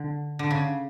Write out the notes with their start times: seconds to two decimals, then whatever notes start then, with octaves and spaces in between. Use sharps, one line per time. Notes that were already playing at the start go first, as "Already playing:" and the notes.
Already playing: D3
0.39 D3
0.51 C#3